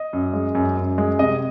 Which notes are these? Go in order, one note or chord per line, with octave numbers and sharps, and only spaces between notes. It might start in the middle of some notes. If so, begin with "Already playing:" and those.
Already playing: D#5
F#2
G#3
F#2
F#2
G#3
C3 D#5